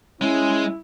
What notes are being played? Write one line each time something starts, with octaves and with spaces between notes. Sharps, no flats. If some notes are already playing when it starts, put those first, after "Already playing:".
G#3 C#4 E4